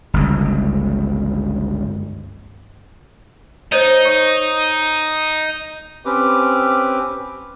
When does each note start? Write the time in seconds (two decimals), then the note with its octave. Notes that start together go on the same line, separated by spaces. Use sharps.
0.14 G1 C#2
3.72 D#4 C5 C#5 D#5
4.05 C#5 C#6
6.05 C4 C#4 G4 B4 D6